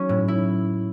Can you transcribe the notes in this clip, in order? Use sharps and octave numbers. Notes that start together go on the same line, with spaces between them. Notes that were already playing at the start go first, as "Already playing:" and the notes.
Already playing: F#3 C#4
A2
E4